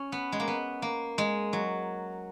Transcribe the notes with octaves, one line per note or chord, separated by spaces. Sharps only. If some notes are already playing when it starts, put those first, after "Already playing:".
Already playing: C#4
B3
G#3
A#3
B3
A#3
G#3
F#3